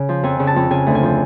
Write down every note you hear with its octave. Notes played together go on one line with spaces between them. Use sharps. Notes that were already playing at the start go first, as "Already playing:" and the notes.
Already playing: C#3
F3
F2 G#5
C#3
A5
F2
C#3 G#5
D2
G#5
F3